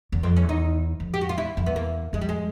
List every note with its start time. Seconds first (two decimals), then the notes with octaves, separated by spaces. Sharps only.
0.12 E2
0.23 F2 C4
0.36 C#4
0.43 E2
0.49 D#4
1.00 F2
1.14 G4
1.21 F#4
1.29 F4
1.37 E2 E4
1.57 F2
1.66 E2 B3
1.76 A#3
2.13 F2 G#3
2.21 G3
2.29 G#3